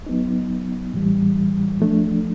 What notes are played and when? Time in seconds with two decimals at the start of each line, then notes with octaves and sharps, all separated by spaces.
0.06 F#3 B3 D#4
0.93 A2 E3 G3
1.80 F3 A3 D4